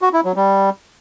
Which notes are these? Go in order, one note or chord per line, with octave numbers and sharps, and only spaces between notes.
F#4
E4
F#3
G3